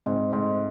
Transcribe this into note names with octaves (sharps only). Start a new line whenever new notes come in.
G#2 C4
G#2 A3